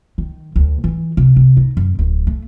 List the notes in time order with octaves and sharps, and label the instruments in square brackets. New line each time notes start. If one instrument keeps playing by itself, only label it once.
[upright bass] D#3
D2
E3
C3
C3
D#4
F#2
D1
A3